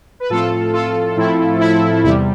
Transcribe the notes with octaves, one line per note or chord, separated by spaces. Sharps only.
B4
A2 F3 A3 C4 F4 A4
F4 A4
A2 F3 A3 C4 E4
E4
E2 C3 G3 E4